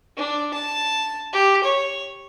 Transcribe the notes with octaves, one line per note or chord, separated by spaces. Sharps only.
D4
A5
G4
C#5